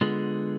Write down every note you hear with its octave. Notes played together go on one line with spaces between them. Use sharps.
D3 G#3 B3 F4 G#4